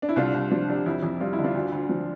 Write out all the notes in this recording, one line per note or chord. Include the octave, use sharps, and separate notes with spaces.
D4
E4
C2 D4 F4
C2
F3 D4
C3 D4
F2 E4
F2
G3 F4
E4
D3
D4 F4
D2
D2
F3